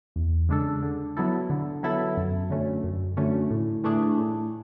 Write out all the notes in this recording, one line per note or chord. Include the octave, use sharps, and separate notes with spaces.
E2
C#3 G#3 D4 A4
D3
F#3 B3 E4 A4
D3
F#3 B3 E4 A4
F#2
D3 F#3 A3 C#4
F#2
D3 F#3 A3 C#4
A2
E3 A3 D4 G#4
A2